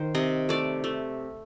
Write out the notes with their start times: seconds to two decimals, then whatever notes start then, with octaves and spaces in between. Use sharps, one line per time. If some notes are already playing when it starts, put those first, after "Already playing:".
Already playing: D#3 C5
0.15 C3 D#5
0.49 A3 D5
0.84 A3